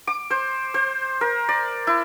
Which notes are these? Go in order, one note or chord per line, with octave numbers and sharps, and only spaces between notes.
D6
C5
C5
A#4
D5
E4